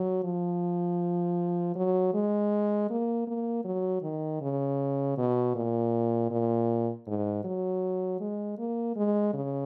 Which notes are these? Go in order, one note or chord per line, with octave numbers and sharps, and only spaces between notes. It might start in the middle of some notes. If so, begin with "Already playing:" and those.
Already playing: F#3
F3
F#3
G#3
A#3
A#3
F#3
D#3
C#3
B2
A#2
A#2
G#2
F#3
G#3
A#3
G#3
C#3